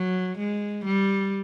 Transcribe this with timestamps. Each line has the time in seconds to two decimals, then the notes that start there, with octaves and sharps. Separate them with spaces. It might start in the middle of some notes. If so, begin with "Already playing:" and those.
Already playing: F#3
0.38 G#3
0.85 G3